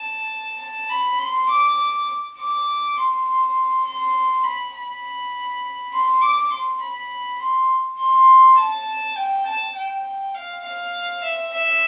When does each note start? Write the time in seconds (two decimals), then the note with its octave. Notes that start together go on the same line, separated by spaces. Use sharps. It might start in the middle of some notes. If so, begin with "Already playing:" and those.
Already playing: A5
0.60 A5
0.89 B5
1.18 C6
1.49 D6
2.38 D6
2.96 C6
3.85 C6
4.44 B5
4.74 B5
5.92 C6
6.21 D6
6.51 C6
6.80 B5
7.39 C6
7.98 C6
8.57 A5
9.16 G5
9.46 A5
9.75 G5
10.34 F5
10.64 F5
11.23 E5
11.52 E5